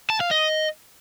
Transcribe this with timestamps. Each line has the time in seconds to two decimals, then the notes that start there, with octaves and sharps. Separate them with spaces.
0.10 A5
0.21 F5
0.31 D#5